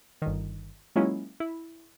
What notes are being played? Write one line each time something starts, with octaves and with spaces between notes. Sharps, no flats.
G1 D#3
F#3 G#3 A#3 C#4 E4 F4
E4